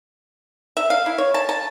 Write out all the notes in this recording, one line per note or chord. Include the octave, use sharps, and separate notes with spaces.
E5
F5
E4
C#5
A5
A5